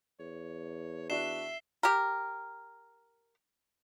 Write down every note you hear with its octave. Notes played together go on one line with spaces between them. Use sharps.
E2 C#5
D4 F#4 E5 C7 E7 G7
G4 A#4